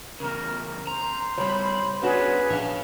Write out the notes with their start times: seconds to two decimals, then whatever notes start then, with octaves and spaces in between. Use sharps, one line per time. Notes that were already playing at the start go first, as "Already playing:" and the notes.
0.20 E2 C#3 A#4
0.87 C5 A#5
1.38 C#3 G3 C#5 B5
2.02 B3 C#4 D4 F#4 G#4 B4
2.50 A#1 C#5 F5